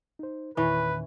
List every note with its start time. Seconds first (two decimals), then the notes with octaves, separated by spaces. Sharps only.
0.19 D#4 C5
0.57 E2 A#2 D#3 E3 C#4 B4